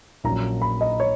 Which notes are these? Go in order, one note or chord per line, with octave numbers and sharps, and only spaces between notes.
A#1 A#2 F#3 C#4 A#5
B5
D#5
C#5